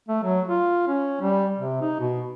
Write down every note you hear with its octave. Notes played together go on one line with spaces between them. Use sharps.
A3
F#3
F4
C#4
G3
C3
D#4
B2